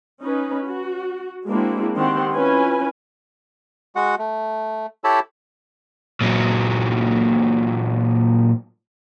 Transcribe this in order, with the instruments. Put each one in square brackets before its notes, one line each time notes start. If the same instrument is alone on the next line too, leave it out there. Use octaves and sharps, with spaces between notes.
[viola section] C#4 D#4 B4
F#4
G#3 A#3 C4 D4 E4 F#4
D#3 C4 G4 F#5 C6
C#4 E4 F4 B4 G#5
[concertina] G#3 F#4 F#5
A3
E4 G4 A4 C#5 A5 B5
[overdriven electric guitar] A#2 F#3